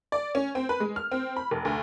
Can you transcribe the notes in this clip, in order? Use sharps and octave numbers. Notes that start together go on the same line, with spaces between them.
D5
C#4
C4
B4
G#3
F6
C4
B5
F1
D2